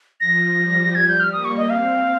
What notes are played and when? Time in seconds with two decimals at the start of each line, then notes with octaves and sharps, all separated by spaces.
0.20 F3 A#6
0.57 G3
0.95 G#6
1.08 G6
1.20 F6
1.33 A#3 D#6
1.45 C#6
1.57 D#5
1.70 C4 F5